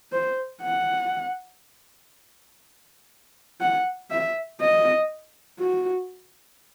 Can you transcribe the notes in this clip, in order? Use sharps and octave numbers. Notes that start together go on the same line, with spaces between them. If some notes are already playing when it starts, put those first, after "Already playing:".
C5
F#5
F#5
E5
D#5
F#4